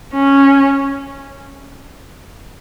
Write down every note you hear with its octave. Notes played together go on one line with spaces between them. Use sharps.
C#4